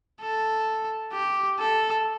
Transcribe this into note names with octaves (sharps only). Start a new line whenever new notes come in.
A4
G4
A4